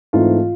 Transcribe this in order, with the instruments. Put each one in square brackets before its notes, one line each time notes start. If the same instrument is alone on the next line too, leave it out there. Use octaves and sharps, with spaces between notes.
[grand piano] G#2 E3 A3 C4 F4